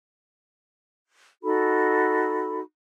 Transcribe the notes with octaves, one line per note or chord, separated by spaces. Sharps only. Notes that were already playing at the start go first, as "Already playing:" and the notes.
D#4 F#4 A4 B5